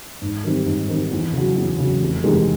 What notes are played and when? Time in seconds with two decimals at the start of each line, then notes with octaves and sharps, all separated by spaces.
0.22 G#2
0.44 D#3 G3 C4
0.66 G#2
0.88 D#3 G3 C4
1.11 E2
1.34 C#3 F#3
1.56 E2
1.79 C#3 F#3
2.01 F1
2.24 E2 C3 D#3 G#3